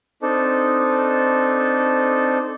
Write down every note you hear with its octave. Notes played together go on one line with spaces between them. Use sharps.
C4 D4 D#4 A4